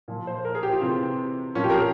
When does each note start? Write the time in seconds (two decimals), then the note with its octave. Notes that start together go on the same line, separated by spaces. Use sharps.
0.08 A#2 F3
0.27 C5
0.45 A#4
0.55 G#4
0.63 G4
0.73 F4
0.81 C3 E3 C4
1.55 A#2 F3 C#4
1.64 G4
1.70 A#4
1.74 G#4